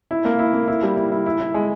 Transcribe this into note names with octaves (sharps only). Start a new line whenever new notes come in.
E4
A#3
E4
A#3
E4
G3
E4
E4
E4
E4
G#3